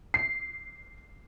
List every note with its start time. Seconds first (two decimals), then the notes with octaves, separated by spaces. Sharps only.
0.14 C7